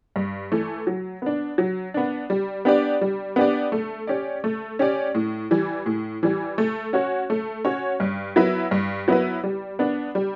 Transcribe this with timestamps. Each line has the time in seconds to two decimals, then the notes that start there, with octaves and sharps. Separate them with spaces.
0.16 G2
0.52 E3 A3
0.87 F#3
1.22 B3 D4
1.58 F#3
1.94 B3 D4
2.30 G3
2.65 B3 D4 G4 D5
3.01 G3
3.36 B3 D4 G4 D5
3.72 A3
4.07 C#4 G4 D5
4.44 A3
4.79 C#4 G4 D5
5.15 A2
5.51 E3 G3
5.86 A2
6.23 E3 G3
6.58 A3
6.93 C#4 F#4 C#5
7.30 A3
7.64 C#4 F#4 C#5
8.00 G2
8.36 F#3 B3 E4 B4
8.71 G2
9.08 F#3 B3 E4 B4
9.44 G3
9.79 B3 D4
10.15 G3